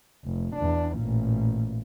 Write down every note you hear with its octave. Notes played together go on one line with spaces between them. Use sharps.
F1
E2 D4
A1 A#2